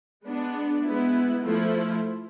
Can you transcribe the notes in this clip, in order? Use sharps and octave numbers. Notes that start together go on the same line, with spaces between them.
G#3 B3 D4
G#3 B3 E4
F3 A3 E4